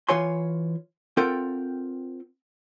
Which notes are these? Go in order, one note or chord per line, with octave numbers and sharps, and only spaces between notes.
E3 F4 C#5 G#5 C6
C4 F4 A4 A#4 F#5 G5